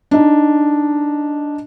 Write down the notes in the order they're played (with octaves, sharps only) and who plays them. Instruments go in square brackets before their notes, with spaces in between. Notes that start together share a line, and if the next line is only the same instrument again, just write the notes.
[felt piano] D4 D#4